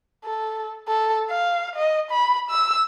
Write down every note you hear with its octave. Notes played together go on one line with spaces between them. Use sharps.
A4
A4
F5
D#5
B5
E6